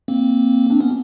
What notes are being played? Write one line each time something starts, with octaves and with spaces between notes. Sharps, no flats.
A#3 C4
C4 D4
B3 C#4